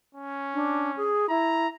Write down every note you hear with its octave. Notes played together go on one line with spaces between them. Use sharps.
C#4
D4
G#4
E4 A#5